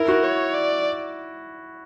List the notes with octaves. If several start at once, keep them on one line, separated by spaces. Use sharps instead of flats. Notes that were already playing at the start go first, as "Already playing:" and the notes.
Already playing: E4 A#4
F#4
C#5
D5